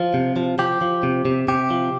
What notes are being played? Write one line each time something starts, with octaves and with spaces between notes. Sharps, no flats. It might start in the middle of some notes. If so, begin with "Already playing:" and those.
Already playing: F3 F4
C3
F3
F3 G4
F3
C3
C3
C3 G4
F3